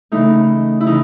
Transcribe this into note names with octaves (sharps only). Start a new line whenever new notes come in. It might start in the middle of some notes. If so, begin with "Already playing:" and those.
C#3 E3 A3 D#4
E4
C#3 E3 D#4